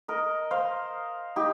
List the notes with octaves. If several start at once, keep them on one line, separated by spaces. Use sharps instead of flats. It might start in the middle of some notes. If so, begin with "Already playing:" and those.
A#4 D#5
C5 F5
D#4 G4